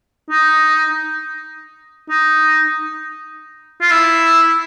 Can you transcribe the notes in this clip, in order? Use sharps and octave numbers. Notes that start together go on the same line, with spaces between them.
D#4
D#4
F4
E4